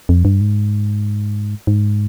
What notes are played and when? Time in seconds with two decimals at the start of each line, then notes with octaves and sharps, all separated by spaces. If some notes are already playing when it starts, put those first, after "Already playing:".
0.09 F2
0.25 G2
0.41 G#2
1.67 G#2